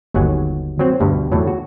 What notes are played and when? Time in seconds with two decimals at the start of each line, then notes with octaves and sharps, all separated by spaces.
0.14 G1 D#2 F#3 F#5 G#5
0.79 F#3 C4
1.00 D2 G2 B2
1.32 E2 A2 F#3
1.47 F#4